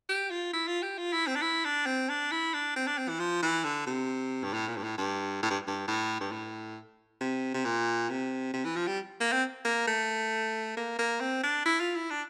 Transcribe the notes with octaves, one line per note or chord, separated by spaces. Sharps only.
G4
F4
E4
F4
G4
F4
E4
C4
D4
E4
D4
C4
D4
E4
D4
C4
D4
C4
E3
F3
E3
D3
C3
G2
A2
A#2
G2
A2
G2
A2
G2
G2
A2
G2
A2
C3
C3
A#2
C3
C3
E3
F3
G3
A#3
C4
A#3
A3
A#3
A#3
C4
D4
E4
F4
E4
D4